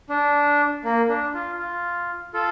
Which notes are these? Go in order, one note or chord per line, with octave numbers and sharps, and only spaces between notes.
D4
A#3
D4
F4
F4
F4 A4